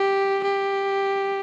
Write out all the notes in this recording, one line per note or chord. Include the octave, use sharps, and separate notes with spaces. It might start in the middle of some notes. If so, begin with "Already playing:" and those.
Already playing: G4
G4